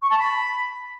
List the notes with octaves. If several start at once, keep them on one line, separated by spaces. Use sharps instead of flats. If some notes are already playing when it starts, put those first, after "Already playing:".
C#6
A5
B5